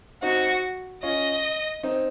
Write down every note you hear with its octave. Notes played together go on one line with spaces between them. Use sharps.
C4 D#4 F#4
C#4 F4 D#5
C4 D#4